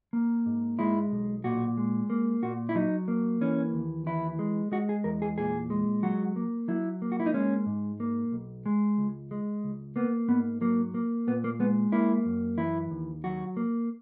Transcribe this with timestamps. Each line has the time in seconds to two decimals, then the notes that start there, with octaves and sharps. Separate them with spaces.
0.13 A#3
0.46 G#2
0.79 G#3 E4
1.12 B1
1.44 A#2 F#4
1.77 G#3
2.10 A#3
2.43 A#2 F#4
2.69 E4
2.75 F#3 D#4
3.08 A#3
3.41 E3 C#4
3.74 D#2
4.06 E3 E4
4.39 G#3
4.72 G#3 F#4
4.89 G#4
5.04 E2 A#4
5.22 G#4
5.38 A#2 G#4
5.70 G#3
6.03 F#3 F#4
6.36 A#3
6.68 F#3 E4
7.02 A#3
7.12 F#4
7.20 E4
7.26 D#4
7.34 G#3 C#4
7.66 G#2
8.00 A#3
8.32 B1
8.66 G#3
8.98 C#2
9.31 G#3
9.64 C#2
9.96 A#3 B3
10.29 G#2 B3
10.61 F#3 A#3
10.94 A#3
11.27 A#2 B3
11.44 A#3
11.60 G#3 B3
11.92 A#3 E4
12.26 F#2
12.58 E3 E4
12.91 D#2
13.24 F#3 F#4
13.57 A#3